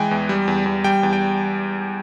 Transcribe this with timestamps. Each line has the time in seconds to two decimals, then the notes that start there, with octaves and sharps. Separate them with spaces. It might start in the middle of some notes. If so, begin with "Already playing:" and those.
Already playing: E3 G#3 G5 G#5
0.11 E2
0.29 G3
0.48 E2
0.66 E2
0.84 G3 G5
1.03 E2
1.13 G5